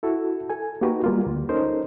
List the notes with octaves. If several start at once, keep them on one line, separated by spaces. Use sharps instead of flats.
E4 F#4 A4
A4 G#5
A#3 D#4 F#4 G4 A#4 B4
G3 A#3 F4
D2
C#4 D#4 A4 A#4 C5